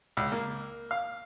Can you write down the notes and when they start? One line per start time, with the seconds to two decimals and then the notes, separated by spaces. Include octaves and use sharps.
0.17 C#2
0.32 A#3
0.91 F5